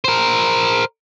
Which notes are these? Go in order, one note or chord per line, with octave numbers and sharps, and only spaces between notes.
A#4 C5